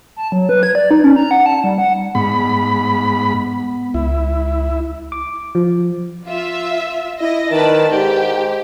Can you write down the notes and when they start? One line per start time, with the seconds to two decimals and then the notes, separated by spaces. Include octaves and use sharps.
0.16 A5
0.32 F#3
0.49 B4
0.63 G#6
0.75 D5
0.91 D#4
1.04 C#4
1.16 A#5
1.31 F#5
1.46 A5
1.64 G3
1.78 F#5
2.15 G#2 B3 B5
3.94 C#2 E4
5.12 D6
5.55 F3
6.26 F4 E5
7.21 E4 D#5
7.51 D#3 B4 D5 A5
7.92 G#2 G4